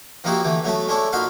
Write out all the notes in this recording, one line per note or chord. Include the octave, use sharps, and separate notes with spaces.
F3 A#3 D#4 E4 F#4 G4
D3 E3 A3
F#3 A3 B3 A5
G#3 A3 C#4 D4 E4 A4
A#2 D#4 F#4 F5 C6